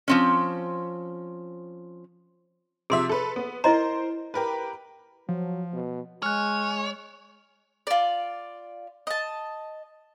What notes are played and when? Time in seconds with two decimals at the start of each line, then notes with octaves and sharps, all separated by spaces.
0.08 F3 C4 C#4
2.90 C3 F3 G#4 E5 C6
3.09 A4 B4
3.36 B3
3.64 E4 A#4 C5 D#5 A#5
4.34 G4 A#4 B4
5.29 F3 F#3
5.74 B2
6.23 G#3 C#5 G#5 F6 F#6
7.87 F4 D5
9.07 D#5 A5